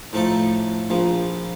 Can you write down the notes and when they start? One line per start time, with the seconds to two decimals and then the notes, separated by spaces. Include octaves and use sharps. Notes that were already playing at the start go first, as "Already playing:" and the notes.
0.13 A2 F3 A3 D#4 A4
0.90 A#1 A#2 F3